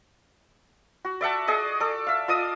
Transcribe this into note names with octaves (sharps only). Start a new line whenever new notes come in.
F#4
D5 E5 F#5 A5
G#4 D5 D#5
A4 D5
E5 F5
F4 D5 D#5 D#6